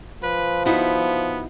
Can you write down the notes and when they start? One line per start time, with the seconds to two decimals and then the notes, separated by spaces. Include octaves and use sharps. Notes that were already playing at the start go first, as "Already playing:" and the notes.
0.23 F3 B4
0.66 B3 D#4 E4 F#4